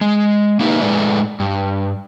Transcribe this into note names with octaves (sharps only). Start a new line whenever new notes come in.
G#3
A#3 D#4 E4 G4 B4
A2 G#3 A3 B4 D5
G2